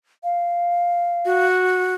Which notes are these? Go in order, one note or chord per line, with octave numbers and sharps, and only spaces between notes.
F5
F#4